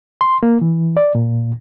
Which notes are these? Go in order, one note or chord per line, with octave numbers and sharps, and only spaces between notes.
C6
A#3
E3
D5
A#2